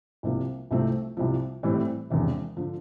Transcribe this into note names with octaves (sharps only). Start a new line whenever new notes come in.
C2 C3 F3 A#3
C2 C3 F3 A3 C4
C2 C3 F3
A2 E3 G3 C4
E1 E2 C3
D3 F3